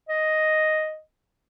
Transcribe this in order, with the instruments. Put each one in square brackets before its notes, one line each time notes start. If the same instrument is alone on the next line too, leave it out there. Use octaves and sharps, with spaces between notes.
[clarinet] D#5